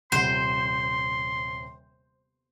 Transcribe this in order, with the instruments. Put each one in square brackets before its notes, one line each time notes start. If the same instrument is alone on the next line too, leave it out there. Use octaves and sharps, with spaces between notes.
[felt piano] D#1 C3 F#5 [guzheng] C5 [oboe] C6